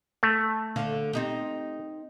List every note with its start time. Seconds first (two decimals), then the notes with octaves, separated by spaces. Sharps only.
0.23 A3
0.76 D2 D3 F5
1.13 C4 D#4 G4